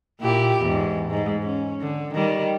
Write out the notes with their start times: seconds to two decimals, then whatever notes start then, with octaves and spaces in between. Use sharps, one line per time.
0.21 A#2 E4 G4
0.62 E2 G#2
1.10 G#2
1.43 C#4
1.81 D3
2.14 D#3 G3